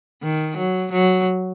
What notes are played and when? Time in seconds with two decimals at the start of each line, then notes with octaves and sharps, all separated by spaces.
0.22 D#3
0.57 F#3
0.92 F#3